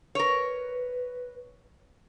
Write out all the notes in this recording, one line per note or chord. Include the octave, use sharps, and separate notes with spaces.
A#4 B4 C#5